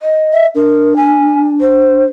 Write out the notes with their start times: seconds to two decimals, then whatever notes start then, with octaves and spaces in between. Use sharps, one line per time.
0.01 D#5
0.33 E5
0.55 D4 A#4
0.96 G#5
1.61 C5